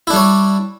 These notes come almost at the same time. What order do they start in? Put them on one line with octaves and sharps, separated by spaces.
E4 D4 G3 C#5